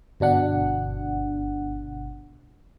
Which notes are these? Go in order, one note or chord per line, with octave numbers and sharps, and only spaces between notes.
G1 B2 D4 F#5